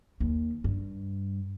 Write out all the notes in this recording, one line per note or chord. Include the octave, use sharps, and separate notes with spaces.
D#2
G2